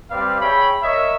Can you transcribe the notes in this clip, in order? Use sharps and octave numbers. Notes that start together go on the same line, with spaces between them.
G3 C4 B4 D5 F5
G#4 C#5 E5 G5 B5
A#4 C#5 D#5 E5